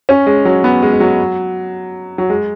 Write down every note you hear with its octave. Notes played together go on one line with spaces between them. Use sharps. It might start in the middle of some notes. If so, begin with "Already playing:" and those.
C#4
G#3
F#3
B3
G#3
G#3
F#3
F#3
G#3